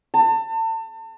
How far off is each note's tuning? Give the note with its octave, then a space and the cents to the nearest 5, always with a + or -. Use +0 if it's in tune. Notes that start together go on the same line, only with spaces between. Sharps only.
A5 +35